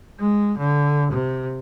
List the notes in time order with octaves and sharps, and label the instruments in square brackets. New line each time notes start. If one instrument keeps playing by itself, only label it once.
[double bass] G#3
D3
C3